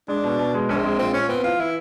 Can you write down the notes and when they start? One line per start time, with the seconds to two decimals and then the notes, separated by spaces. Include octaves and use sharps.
0.08 G#3 D4
0.24 B2
0.39 B2
0.54 G#3
0.69 A#1 C#4
0.76 C4
0.84 G#3
0.99 A#2 C4
1.13 A#2 C#4
1.29 B3 C4
1.44 E3 F4
1.59 E3 E4